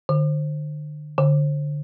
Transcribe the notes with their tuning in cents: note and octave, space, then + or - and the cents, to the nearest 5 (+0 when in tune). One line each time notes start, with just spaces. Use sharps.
D3 +35
D3 +5